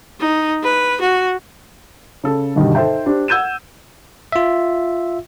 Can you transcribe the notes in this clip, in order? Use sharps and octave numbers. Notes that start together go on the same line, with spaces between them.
D#4
B4
F#4
C#3 A4
G2 B2 D3 D#3 G3
D#4 A4 C5 E5 G5
D4 G4 C5
F#5 E6 G6 G#6 D#7 E7
F4 E5